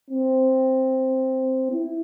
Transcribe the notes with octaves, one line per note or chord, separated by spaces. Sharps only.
C4
E4